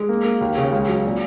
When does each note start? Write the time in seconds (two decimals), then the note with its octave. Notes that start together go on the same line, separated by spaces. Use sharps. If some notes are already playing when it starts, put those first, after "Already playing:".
Already playing: G#3
0.09 A#3
0.24 A#3
0.41 D#2
0.57 C#3
0.72 C#2
0.88 F#3
1.05 A#2